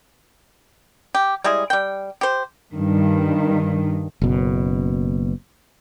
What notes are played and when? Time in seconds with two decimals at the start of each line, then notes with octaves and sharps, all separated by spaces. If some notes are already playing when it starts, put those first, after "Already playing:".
1.15 G4
1.44 G3 G#3 E4 G#4
1.70 G3 G5
2.21 G4 C5
2.74 G2 D#3
4.22 F#1 B2